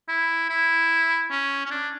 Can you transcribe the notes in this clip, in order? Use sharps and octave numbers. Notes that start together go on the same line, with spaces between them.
E4
E4
C#4
C#4
D4